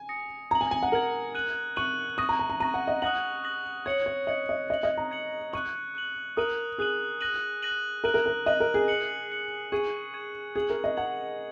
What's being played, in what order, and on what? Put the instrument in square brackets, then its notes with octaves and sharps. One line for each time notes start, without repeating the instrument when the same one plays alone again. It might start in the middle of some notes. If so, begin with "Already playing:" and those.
Already playing: [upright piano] G#5
[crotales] D#6 A#6 C#7
[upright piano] A#5 [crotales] G#6
[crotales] F#7
[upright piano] G#5
G#5
F#5
[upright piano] A#4 [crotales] G#6 F#7
[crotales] F#6 D#7 F#7
[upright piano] C#6 [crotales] F#6 D#7 F#7
[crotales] C#6 A#6 D#7 [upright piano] D#6
[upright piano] A#5
A#5
A#5
[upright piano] A#5 [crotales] C#6 A#6 D#7
[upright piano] F#5
D#5
[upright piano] F#5 [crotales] D#6 F#6 A#6 F#7
[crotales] D#6 F#6 A#6 F#7
[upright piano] C#5 [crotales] G#6 C#7 F#7
[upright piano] C#5
[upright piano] D#5 [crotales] G#6 C#7 F#7
[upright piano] D#5
[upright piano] D#5 [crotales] G#6 C#7 F#7
[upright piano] D#5
A#5
[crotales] G#6 C#7 F#7
[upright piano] C#6 [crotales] F#6 D#7 F#7
[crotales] F#6 D#7 F#7
[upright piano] A#4 [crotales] D#6 F#6 D#7 F#7
[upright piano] G#4 [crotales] D#6 F#6 D#7 F#7
[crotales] F#6 A#6 D#7 F#7
F#6 A#6 D#7 F#7
[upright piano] A#4 [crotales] F#6 D#7 F#7
[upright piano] A#4
A#4
[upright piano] D#5 [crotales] F#6 D#7 F#7
[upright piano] A#4
G#4
[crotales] F#6 C#7 F#7
F#6 C#7 F#7
[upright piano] G#4 [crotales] C#6 G#6 D#7
[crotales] C#6 G#6 D#7
[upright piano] G#4 [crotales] G#6 F#7
[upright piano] A#4
D#5
[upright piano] F#5 [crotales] G#6 F#7